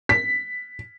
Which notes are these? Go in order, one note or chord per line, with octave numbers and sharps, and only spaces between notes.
B6